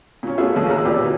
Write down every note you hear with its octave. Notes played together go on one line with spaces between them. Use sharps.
A#2 C#4
A3 B3 C#4 F4 G#4 E5
A#1 D#2 A2 C#4
A1 A2 A#3 G#4 A#4 E6
A#2 G4 B4 D5
B2 E3